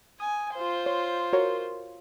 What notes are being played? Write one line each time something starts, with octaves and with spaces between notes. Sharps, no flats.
G#5 D#6
F4 C5
C#5
F#4 A#4 C#5